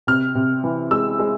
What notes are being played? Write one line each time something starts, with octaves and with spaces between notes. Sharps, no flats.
C3 F6
C3
E3
G#3 E6
G#3